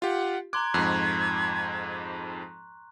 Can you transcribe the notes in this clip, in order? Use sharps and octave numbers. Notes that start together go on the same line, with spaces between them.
F4 G4 F#5
A#5 C6 D6 F#6 G#6
F2 G#2 C#6 F#6 F#7